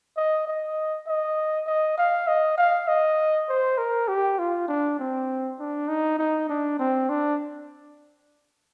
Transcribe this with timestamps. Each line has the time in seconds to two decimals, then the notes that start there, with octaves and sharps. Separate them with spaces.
0.17 D#5
0.47 D#5
1.07 D#5
1.67 D#5
1.98 F5
2.28 D#5
2.58 F5
2.88 D#5
3.49 C5
3.78 A#4
4.08 G4
4.39 F4
4.68 D4
4.99 C4
5.59 D4
5.89 D#4
6.19 D#4
6.49 D4
6.79 C4
7.10 D4